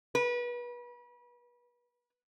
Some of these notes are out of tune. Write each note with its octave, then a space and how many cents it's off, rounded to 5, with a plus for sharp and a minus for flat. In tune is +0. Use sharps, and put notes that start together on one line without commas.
B4 -35